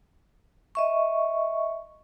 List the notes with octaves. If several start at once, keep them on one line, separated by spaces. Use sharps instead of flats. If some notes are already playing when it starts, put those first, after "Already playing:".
D#5 E5 C#6